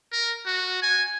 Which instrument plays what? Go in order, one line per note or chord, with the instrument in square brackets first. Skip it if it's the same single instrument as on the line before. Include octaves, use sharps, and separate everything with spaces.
[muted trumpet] A#4
F#4
G#5